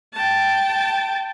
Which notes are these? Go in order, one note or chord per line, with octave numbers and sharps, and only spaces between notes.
G5 A5